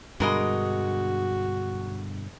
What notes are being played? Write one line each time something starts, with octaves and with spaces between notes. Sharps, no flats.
G2 B2 D3 G#3 F#4 A#4 D#5